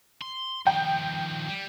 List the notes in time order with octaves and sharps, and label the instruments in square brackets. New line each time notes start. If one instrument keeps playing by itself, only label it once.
[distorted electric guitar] C6
[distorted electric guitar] D#3 F3 [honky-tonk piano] G5
[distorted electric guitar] G3